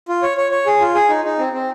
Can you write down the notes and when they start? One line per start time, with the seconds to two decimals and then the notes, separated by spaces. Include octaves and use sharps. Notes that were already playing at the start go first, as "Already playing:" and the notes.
0.09 F4
0.23 C#5
0.37 C#5
0.51 C#5
0.67 G#4
0.80 F4
0.95 G#4
1.09 D#4
1.25 D#4
1.39 C4
1.53 C4